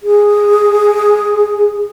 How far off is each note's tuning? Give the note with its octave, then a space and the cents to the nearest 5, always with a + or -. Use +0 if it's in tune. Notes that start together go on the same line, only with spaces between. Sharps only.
G#4 -5